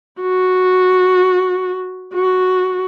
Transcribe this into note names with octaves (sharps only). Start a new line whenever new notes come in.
F#4
F#4